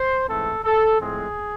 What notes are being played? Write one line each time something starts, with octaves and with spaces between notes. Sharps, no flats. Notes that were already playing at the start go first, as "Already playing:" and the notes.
Already playing: C5
G#2 E3 A3 C4 A4
A4
A2 F3 G#3 C4 G#4